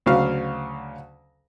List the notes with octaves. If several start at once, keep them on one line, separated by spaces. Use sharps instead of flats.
D2 C#3 F#3 F5